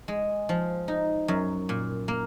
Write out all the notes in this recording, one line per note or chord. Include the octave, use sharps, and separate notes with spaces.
G#3
F3
D#4
F#2
A#2
A#3